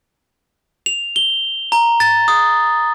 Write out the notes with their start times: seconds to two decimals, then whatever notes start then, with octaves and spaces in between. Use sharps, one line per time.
0.86 F7
1.16 G7
1.72 A#5
2.00 A6
2.28 D#6